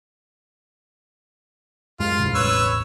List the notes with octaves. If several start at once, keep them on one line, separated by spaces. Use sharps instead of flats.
F#2 G#3 F4
E1 A1 C#3
B4 C#5 E6